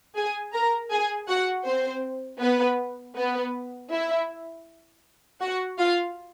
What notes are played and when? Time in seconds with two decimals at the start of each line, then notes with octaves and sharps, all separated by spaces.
0.15 G#4 G#5
0.53 A#4 A#5
0.91 G#4 G#5
1.28 F#4 F#5
1.65 C4 C5
2.40 B3 B4
3.16 B3 B4
3.91 E4 E5
5.40 F#4 F#5
5.78 F4 F5